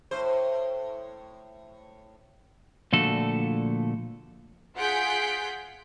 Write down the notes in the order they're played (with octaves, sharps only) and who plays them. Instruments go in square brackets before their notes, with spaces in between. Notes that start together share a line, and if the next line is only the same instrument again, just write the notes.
[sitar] A2 C5
[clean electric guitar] A#2 D3 F3 A3 F#4 A4
[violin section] F4 G#4 F#5 G6 B6 D7